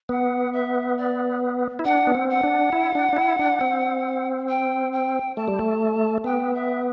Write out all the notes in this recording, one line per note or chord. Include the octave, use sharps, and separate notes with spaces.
B3 F#5
E5
D5
E4
D4 F#5
B3
C4
F#5
D4
E4
D4
D4
E4
D4
C4
G5
G5
A3 A5
G3
A3
B3 G5
E5